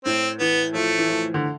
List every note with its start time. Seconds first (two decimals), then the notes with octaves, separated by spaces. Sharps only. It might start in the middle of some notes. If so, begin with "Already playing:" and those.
0.05 A2 C4
0.39 E3 B3
0.74 F3 A3
0.98 E3
1.09 F3
1.34 D3